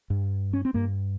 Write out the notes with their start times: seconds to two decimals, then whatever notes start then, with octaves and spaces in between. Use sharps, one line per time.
0.10 G2
0.53 C#4
0.65 C4
0.74 G2 A#3